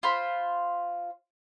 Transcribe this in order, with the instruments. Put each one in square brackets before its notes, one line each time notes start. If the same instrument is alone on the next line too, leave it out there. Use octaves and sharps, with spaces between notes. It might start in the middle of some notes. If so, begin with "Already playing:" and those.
[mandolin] F4 C5 B5